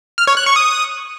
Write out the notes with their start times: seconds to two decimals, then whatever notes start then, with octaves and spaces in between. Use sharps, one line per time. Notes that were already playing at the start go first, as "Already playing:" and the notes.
0.18 F6
0.27 C#5
0.37 F#6
0.46 C#6
0.56 D#6